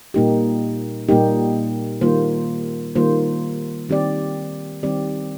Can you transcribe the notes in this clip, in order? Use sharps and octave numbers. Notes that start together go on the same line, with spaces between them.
A#2 G3 A#3 D#4 G4
A#2 G3 A#3 D#4 G4
D#3 G3 A#3 F4 C5
D#3 G3 A#3 F4 C5
D#3 G3 C4 G4 D5
D#3 G3 C4 G4 D5